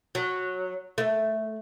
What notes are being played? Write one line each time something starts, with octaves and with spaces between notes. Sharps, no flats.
F#3
A3